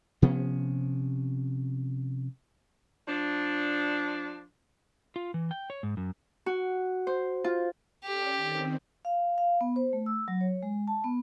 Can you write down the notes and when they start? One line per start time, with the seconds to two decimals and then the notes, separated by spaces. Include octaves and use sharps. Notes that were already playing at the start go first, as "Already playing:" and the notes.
0.22 C3 F3 B3 C#4
3.07 F3 D4
5.16 F4
5.34 E3
5.51 G5
5.70 C#5
5.83 G#2
5.97 F#2
6.46 F#4
7.07 C5
7.44 F4
8.04 C#4 G4 A4 D5
8.36 D#3 C4
9.05 F5
9.38 F5
9.61 B3
9.76 C5
9.93 A3
10.06 E6
10.28 F#3
10.41 C#5
10.63 G#3
10.88 A5
11.04 B3